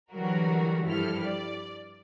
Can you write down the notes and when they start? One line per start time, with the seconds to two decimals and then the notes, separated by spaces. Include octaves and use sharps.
0.12 D3 E3 F#3 G3 F#4 A#4
0.86 G2 F3 G3 E4 A4 F6
1.22 D5